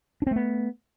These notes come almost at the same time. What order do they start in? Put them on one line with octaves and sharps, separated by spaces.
D4 C4 A3 B3